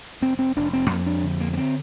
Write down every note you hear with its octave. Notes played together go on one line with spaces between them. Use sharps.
F1 C4
C4
F1 D4
C4
F2 A#3
D4
D3
A#3
A#3
C4